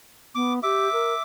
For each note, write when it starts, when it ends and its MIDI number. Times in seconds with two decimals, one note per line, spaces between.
0.35 0.59 59
0.35 0.53 86
0.63 0.91 67
0.63 1.23 76
0.63 1.23 86
0.92 1.13 70